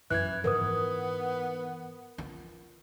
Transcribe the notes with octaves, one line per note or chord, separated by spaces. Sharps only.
F#2 E3 F#6 G#6
G#2 E3 B3 A#4 B4 D#6
F4